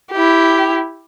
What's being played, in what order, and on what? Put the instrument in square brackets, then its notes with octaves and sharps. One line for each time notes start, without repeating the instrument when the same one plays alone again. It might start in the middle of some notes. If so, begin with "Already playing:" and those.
[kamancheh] E4 G4